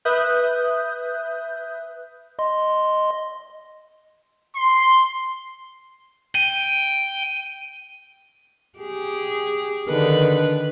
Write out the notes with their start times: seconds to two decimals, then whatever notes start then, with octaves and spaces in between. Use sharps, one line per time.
0.05 B4 E5 D#6 F#6 G6
2.39 D#5 C6
4.55 C6
6.35 G5 D#7
8.79 G4 G#4
9.89 D3 D#3 B4